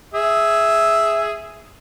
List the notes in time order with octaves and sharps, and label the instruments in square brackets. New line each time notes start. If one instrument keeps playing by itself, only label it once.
[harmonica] G#4 E5